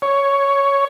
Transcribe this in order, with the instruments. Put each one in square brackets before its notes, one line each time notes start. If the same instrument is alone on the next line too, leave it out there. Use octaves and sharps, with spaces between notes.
[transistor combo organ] C#5